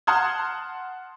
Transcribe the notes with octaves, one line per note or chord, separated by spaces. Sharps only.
F#5 A5 C6 D#6 F6 G#6